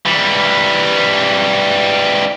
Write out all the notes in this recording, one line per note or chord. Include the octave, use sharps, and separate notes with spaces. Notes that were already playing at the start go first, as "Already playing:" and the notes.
E3 G3